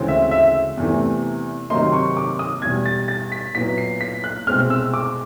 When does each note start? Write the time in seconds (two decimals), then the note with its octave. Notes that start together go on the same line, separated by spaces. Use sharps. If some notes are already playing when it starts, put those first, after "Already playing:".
Already playing: D2 C#3 E3 G#3 C4
0.08 E5
0.31 E5
0.77 E2 C3 E3 A3
1.70 C3 D#3 F#3 A#3 D#4 C6
1.93 C#6
2.17 D6
2.39 D#6
2.62 E2 B2 G3 G#6
2.85 A6
3.08 A6
3.32 B6
3.55 A#2 F#3 B3 E4 B6
3.78 C7
4.01 B6
4.24 F#6
4.47 C2 B2 G#3 C4 F6
4.70 E6
4.94 D6